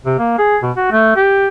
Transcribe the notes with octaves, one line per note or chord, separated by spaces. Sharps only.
C3
A#3
G#4
B2
F#4
A3
G4